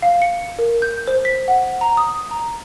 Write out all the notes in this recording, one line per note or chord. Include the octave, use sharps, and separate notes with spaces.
F5
C#7
A#4
G6
C5
B6
F#5
A#5
D#6
A#5